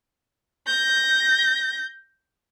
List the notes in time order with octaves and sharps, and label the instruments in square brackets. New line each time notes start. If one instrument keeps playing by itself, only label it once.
[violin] G6 A#6